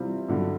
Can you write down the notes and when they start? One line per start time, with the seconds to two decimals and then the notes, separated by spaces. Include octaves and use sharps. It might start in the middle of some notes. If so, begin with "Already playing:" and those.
Already playing: C3 E3 G3 C4 F4
0.28 G2 D3 F#3